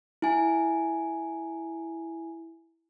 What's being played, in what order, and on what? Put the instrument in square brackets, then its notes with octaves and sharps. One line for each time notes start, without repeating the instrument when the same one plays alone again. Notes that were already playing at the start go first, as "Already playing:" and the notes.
[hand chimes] E4 G#5